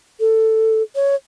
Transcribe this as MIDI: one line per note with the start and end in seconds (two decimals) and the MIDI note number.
0.20 0.82 69
0.95 1.15 73